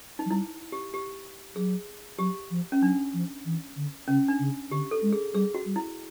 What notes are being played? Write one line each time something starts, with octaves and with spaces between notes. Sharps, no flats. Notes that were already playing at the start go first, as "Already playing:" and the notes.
D#4
F#3
G3 E4
G4
G4
F#3 G#4
F#3 G4
F3
C#4
F#3 D4
F3
E3
D3
C#3 C#4
D4
C#3
D3 G4
A4
G#3
G#4
G3 G#4
F#4
G3
E4